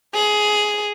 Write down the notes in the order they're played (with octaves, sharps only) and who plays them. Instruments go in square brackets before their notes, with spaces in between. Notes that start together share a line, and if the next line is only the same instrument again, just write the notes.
[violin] G#4